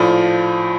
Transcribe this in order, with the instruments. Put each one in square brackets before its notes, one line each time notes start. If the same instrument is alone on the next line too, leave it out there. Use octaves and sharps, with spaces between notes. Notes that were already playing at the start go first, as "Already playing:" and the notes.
Already playing: [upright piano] A#1 A2 F3